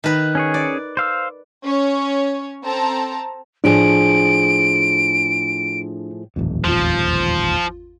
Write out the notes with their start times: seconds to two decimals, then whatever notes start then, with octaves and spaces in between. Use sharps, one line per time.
0.04 D#3 B4
0.35 C#4 G#4 C#5
0.54 D5
0.97 C5 F5 E6
1.65 C#4 C#5
2.65 C4 A4 A5 A#5
3.64 A2 F3 D4 G#4 D7
6.36 D#1 A1 F2
6.64 G#1 E2 F3 F4